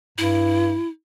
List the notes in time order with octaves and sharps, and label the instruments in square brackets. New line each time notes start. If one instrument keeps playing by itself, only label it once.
[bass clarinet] G2 [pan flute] E4